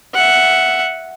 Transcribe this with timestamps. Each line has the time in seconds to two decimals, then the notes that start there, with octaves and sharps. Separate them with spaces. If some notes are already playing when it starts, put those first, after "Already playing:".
0.15 E5 F#5